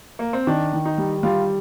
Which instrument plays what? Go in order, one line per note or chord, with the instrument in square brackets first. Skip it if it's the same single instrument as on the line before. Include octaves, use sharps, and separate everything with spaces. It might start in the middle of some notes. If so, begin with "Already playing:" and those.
[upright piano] A#3
C4
[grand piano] D#3 [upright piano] D4
[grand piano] D#3
[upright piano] D#4
[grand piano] G3
[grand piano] G3 [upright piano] F4